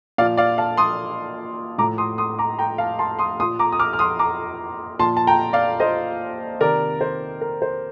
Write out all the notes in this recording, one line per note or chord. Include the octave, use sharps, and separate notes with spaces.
A#2 F3 D5 F5
D5 F5
F5 A5
C6 D#6
A2 F3 A#5 D6
C6 D#6
C6 D#6
A#5 D6
G5 A#5
F5 A5
A5 C6
C6 D#6
A#2 F3 C6 D#6
A#5 D6
D#6
D6 F6
F6
C6 D#6
A#5 D6
A#2 F3 A5 C6
A5
G5 A#5
D5 F5
C5 D#5
C3 D#3 A#4 D5
C5
A#4
C5